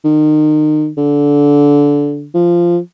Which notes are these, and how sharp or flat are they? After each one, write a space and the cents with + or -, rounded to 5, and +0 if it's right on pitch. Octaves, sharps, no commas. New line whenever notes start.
D#3 -30
D3 -20
F3 -10